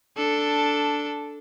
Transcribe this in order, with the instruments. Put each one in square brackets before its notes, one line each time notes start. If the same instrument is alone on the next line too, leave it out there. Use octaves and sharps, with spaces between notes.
[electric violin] D4 A4